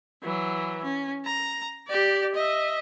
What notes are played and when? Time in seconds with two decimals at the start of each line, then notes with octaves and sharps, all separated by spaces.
0.23 E3 F#3
0.83 C#4
1.25 A#5
1.87 G4 D5
2.34 D#5 E5